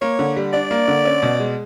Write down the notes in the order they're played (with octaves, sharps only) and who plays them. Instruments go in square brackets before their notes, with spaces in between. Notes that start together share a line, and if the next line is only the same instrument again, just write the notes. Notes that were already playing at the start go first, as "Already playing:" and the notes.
[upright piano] A#3 [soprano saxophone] C#5
[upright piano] D3
G3
[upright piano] D4 [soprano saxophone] D5
[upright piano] A#3
D3
C#4
B2
G#3